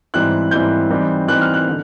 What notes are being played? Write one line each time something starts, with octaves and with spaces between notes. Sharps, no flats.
G#2 E3 G3 C4 E4 F#6
G#2 E3 G3 C4 E4 G6
E3 G3 C4 D#4
E3 G3 C4 D#4 F#6
F6
F#6
D3